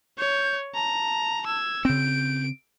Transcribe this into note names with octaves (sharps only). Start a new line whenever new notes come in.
C#5 G6
A5 A#5
E6 G#6
C#3 C4 G6 D7